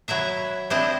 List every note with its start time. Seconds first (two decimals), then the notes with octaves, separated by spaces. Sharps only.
0.08 F#3 E4 E5 A#5
0.70 C4 D4 E4 C5 D#5